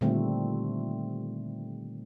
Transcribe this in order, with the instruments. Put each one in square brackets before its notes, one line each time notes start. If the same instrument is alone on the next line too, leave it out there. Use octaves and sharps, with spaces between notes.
[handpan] A#2 D3 D#3 G3 A3 C4